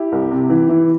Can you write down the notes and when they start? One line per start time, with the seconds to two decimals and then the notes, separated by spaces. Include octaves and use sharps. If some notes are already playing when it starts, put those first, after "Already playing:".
Already playing: E4 G4
0.12 C2
0.31 C3
0.50 E3
0.69 E3